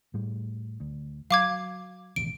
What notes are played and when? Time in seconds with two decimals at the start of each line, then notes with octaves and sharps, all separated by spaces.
0.14 A2 G3
0.80 D2
1.31 F#3 F5 D6 G#6
2.16 E1 A1 D#2 D7